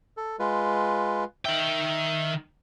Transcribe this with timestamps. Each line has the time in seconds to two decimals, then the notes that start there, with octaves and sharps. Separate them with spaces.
0.17 A4
0.39 G#3 F4 B4
1.45 D#3 E5 G5